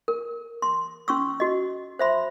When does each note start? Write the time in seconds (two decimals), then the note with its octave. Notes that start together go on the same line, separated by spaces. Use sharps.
0.08 A#4
0.62 C6
1.08 C#4 C6 C#6 E6
1.40 F#4 D#5
1.99 C5 E5 B5 C6